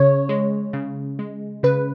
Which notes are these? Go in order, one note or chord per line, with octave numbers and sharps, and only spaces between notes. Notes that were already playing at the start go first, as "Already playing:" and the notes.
Already playing: C#3 C#5
G#3
C#3
G#3
C#3 B4